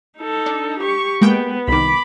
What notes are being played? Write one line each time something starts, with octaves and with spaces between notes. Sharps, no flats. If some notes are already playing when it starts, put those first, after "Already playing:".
D#4 A4
D4
G4 C#6
G#3 A#3 B3 G5
C2 D#3 B5 D6